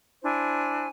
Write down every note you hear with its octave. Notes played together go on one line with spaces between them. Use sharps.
D4 E4 C5 G#5